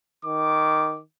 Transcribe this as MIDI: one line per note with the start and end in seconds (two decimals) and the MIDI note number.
0.25 1.01 51
0.25 0.99 86